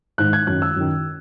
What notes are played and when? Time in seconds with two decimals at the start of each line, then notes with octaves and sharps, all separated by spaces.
0.18 G#2 D#3 F#6
0.33 G#6
0.47 F#2 D#3 F#6
0.62 E6
0.76 F#2 D#3